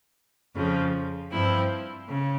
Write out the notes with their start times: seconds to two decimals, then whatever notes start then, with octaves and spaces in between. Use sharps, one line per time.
0.55 F2 C#3 F3
1.31 G2 F3 C4 E4
2.08 C#3